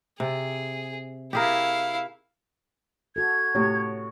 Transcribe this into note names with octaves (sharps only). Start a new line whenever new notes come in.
C3 G#4
E4 G4 G#4 A#4 F5
F#4 A4 G#6
A2 C3 C#5